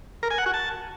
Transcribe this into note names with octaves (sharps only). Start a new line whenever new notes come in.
A#4
G#5
F#5
F#4
A5